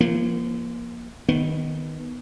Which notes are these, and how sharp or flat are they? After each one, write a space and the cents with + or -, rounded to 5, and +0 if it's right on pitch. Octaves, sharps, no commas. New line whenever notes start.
F3 -30 A#3 +15
D#3 +0 B3 +0